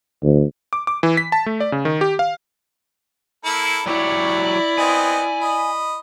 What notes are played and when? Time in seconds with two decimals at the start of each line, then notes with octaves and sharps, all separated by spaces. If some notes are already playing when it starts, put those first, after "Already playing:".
0.24 D2
0.73 D6
0.87 D6
1.03 E3
1.17 B6
1.32 A5
1.46 A3
1.60 D5
1.72 C#3
1.85 D#3
2.01 G4
2.19 F5
3.45 A#3 E4 A4
3.86 F#3 E4 G4 C#5 D5
4.78 B3 C4 D#5 G#5
5.41 D#5 B5